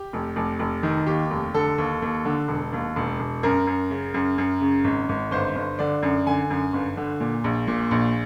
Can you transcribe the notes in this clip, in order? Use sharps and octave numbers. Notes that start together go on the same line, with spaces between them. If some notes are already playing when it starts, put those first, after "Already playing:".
Already playing: G4
F1
F1
F1
D#3
D#2 G4
F1
D3 A4
D#2
D#2
D3
E1
D#2
E1
E1
F#2 A#4
F#2
C#3
F#2
F#2
C#3
G#1
G#1
G1 C5
G1
D3 D5
F#2
D3 G#5
F#2
G1
D3
A#2
A#1
A#2
A#1